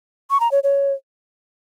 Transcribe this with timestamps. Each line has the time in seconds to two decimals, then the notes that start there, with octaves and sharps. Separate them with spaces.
0.30 C#6
0.40 A#5
0.52 C#5
0.63 C#5